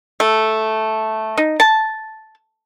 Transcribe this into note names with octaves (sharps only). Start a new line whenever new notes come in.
A3
D#4
A5